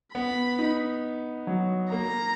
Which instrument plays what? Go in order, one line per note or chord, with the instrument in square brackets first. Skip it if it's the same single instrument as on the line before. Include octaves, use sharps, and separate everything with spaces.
[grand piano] B3 [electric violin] B5
[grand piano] D#4
F#3
[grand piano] A#3 [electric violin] A#5